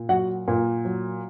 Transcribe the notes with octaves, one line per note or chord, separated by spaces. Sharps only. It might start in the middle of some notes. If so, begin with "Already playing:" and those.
Already playing: A#2
F#3 F#4 F#5
A#2
F#3